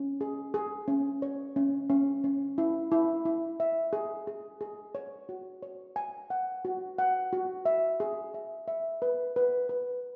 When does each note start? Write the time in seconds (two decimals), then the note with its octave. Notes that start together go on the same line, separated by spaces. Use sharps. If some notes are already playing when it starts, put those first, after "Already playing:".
Already playing: C#4
0.21 G#4
0.54 G#4
0.88 C#4
1.22 C#5
1.56 C#4
1.90 C#4
2.24 C#4
2.58 E4
2.91 E4
3.25 E4
3.60 E5
3.93 G#4
4.27 G#4
4.61 G#4
4.95 C#5
5.29 F#4
5.63 C#5
5.96 G#5
6.30 F#5
6.65 F#4
6.98 F#5
7.33 F#4
7.65 E5
8.00 G#4
8.34 E5
8.68 E5
9.02 B4
9.36 B4
9.69 B4